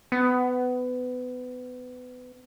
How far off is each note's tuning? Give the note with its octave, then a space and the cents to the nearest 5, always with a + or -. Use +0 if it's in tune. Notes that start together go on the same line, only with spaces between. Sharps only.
B3 +25